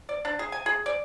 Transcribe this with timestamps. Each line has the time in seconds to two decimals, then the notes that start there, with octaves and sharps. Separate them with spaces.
0.09 D5
0.25 D4
0.39 G#4
0.52 G#5
0.66 G#4
0.86 D5